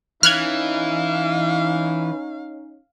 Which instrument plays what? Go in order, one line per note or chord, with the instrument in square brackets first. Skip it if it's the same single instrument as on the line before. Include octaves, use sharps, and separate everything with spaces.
[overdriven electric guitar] E3 [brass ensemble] C#4 D#4 [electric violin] F5 [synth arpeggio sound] F6 F#6 G#6